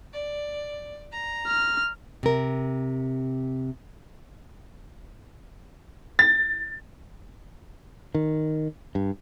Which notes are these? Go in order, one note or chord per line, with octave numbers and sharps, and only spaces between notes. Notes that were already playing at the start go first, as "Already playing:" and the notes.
D5
A#5
F6
C3 A#4
A6
D#3
G2